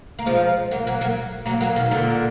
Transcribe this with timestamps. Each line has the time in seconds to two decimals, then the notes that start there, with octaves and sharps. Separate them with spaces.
0.19 A#3
0.26 F3 G#3
0.71 F#3 A#3
0.87 F#3 A#3
1.01 F#3 A#3
1.46 F#3 A#3
1.61 F#3 A#3
1.76 B2 D#3
1.91 A#2 D3